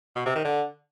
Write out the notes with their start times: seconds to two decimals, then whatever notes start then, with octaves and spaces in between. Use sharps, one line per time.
0.16 B2
0.26 C3
0.35 D#3
0.45 D3